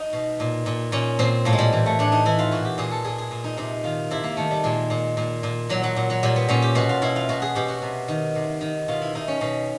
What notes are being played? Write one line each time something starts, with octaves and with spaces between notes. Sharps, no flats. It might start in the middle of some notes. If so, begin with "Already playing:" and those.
Already playing: D#4
B2
A#2
A#2
A#2 C#4
A#2 C4
A2 A#3
G#3
G3
E3
A3
A2 D4
D#4
E3 E4
F4
A#2 F#4
G4
A#2 G#4
A4
A#2 G#4
G#4
A#2
D#4
C3 D#4
D#3 F4
C3 E4
A#3
D#3 A3
G3
A#2 G#3
A#2
A#2
A#2
A#2 F#3
F#3
A#2
F#3
A#2 G3
B3
A#2 C#4
G4
B2 F#4
F4
B2 E4
F4
B2 F#4
G#4
B2 G4
F#4
C3
D#3
C3
D#3
B2 F4
E4
B2 D#4
C#4
B2 C#4